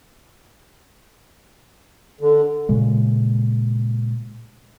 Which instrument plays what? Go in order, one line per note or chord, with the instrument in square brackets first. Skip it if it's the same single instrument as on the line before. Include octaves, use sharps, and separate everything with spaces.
[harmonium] D3
[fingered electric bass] A#2 C#3 G#3